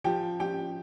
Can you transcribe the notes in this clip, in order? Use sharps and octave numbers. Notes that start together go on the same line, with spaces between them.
F3 G4 G5
F3 G4 G5